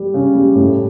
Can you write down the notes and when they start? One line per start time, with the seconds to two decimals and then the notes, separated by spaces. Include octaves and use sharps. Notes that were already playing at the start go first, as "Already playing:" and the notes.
Already playing: G3
0.14 C#3
0.35 G3
0.55 A2